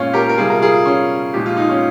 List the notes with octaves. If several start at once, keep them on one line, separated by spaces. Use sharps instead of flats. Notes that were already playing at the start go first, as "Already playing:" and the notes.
Already playing: A#2 G#3 C#4 F4
G4 A#4
A#4
C3 G3 F4 G#4
A#4
F4 G#4
C#4 F4
A#2 F3 G#3 G4
F4
D#4
C#4 F4